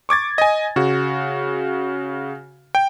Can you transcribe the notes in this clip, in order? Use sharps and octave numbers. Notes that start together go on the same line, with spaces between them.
C#6 D6 G#6 A6
D#5 G#5
C#3 F#4
G5